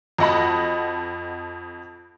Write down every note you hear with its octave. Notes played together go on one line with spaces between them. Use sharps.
F2 F#4 D#5 F#5 A5 B5